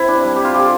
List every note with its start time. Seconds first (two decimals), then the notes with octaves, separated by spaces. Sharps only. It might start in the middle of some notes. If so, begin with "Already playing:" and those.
Already playing: C3 E4
0.08 D4
0.23 G3
0.36 G4
0.44 F4
0.54 G4
0.59 A4